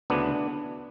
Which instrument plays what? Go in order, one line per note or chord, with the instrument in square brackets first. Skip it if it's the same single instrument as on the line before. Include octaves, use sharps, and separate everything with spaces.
[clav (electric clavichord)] D2 C#3 E3 B3 D4